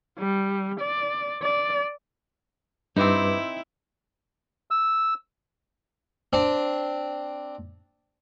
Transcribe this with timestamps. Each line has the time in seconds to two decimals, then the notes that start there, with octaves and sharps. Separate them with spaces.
0.19 G3
0.81 D5
1.42 D5
2.96 G2 C4 D#4 E4 B4 D6
4.71 E6
6.33 C4 D4